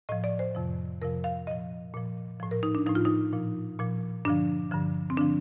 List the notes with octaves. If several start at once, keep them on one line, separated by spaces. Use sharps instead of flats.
A2 F3 D#5
D5
C5
F2 C3 F3
F2 C3 F3 A#4
F5
A#2 F3 D#5
A#2 F3
A2 F3
A#4
D#4
D4
A2 F3 D#4
F4
D#4
A#2 F3
A#2 F3
G2 D3 F3 D4
G2 D3 F3
C4
D3 F3 D4